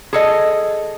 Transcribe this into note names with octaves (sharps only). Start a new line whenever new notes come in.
G#4 A4 D#5